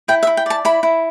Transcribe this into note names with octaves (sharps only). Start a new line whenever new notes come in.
E4 G5
E5
E4
G5
D5 A5
E4 B5
E4